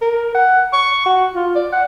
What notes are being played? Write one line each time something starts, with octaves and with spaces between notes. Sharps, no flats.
A#4
F#5
C#6
F#4
F4
D5
F#5